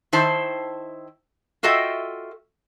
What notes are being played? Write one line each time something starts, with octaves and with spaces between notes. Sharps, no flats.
D#3 E4 C5 A5
F4 F#4 A4 D#5 E5 G5